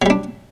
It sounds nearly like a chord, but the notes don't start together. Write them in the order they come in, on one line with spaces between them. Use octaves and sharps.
F#3 G3 D4